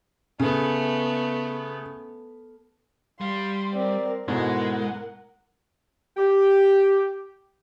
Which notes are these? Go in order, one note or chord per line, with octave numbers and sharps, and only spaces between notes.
C#3 A3 B3
G3 F5 C6
C4 A#4 D5
G#2 B2 G#3 A3 E4 A#4 F#5
G4